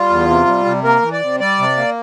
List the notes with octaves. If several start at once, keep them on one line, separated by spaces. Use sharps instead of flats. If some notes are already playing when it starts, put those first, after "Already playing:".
Already playing: G3 F4
E2
C3
G3
C3
A#3 A#4
E3
D5
C3
G3 D5
C3
A#3